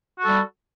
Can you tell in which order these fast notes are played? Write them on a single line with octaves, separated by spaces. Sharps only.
F#4 A4 G3